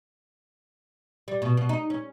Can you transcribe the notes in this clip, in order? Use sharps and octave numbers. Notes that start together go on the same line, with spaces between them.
G3
B2
B2
D#4
C#4